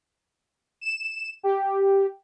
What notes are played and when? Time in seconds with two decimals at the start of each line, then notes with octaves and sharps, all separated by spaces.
0.81 E7
1.43 G4